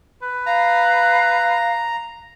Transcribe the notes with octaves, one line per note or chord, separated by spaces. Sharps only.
B4
F5 A#5